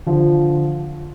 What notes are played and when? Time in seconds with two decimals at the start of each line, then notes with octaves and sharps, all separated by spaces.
0.06 D3 F3